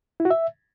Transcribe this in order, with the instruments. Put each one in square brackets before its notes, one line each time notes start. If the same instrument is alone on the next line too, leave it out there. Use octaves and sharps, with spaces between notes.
[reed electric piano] E4
F#4
E5